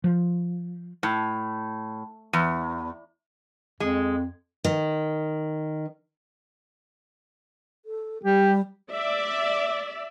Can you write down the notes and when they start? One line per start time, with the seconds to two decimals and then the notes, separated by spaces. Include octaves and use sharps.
0.04 F3
1.03 A2
2.33 E2
3.80 F2 G#3
4.65 D#3
7.86 A4
8.23 G3 G4
8.91 D5 E5